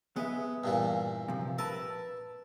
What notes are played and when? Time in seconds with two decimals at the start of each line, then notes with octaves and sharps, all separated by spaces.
0.16 G#3 B3 B4 E5
0.64 G2 A#2 E3
1.28 C3 F3
1.59 A#4 B4 E5 A5